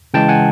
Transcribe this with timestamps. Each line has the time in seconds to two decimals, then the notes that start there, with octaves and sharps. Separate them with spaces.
0.14 C#3 E3 G#3 G5 A5
0.29 F#5 G#5